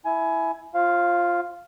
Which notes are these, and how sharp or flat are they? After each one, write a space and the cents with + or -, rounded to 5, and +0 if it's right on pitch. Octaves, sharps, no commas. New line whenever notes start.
E4 +0 G#5 +20
F4 +0 C5 +30 F5 +0